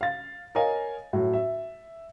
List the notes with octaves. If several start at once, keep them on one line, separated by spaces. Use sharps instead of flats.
F5 A6
A#4 C#5 D#5 F5 G#5
A2 F#3
E5